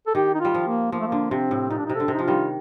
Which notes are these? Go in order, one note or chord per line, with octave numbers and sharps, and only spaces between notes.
A4
D#3 G4
D#4
G3 F4
F3
A#3
F3 A#3
A3
D3 A#3
C3 C4
A2
A#2 D#4
D4
C3 D#4
D3 A4
C3
D#4
F3 F4
D#3 G3